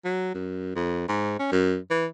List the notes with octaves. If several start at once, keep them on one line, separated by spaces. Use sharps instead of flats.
F#3
F#2
F2
G#2
C#4
F#2
E3